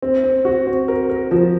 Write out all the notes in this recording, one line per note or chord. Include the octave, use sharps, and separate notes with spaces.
C4
C4
F#4
C4
A#4
A#4
F3